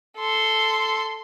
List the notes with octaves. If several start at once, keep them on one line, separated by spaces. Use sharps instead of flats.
A4 C6